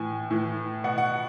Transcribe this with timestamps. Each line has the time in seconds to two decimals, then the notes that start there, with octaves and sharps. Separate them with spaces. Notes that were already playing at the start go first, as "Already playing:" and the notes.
Already playing: A2 E3 G#5
0.30 A2 E3
0.84 B2 F#5
0.98 F#5